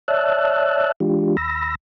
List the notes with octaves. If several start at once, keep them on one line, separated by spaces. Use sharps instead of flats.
C#5 D5 E5 A5 E6 F#6
E3 G#3 D4 F4 G4
D#2 B5 E6 A#6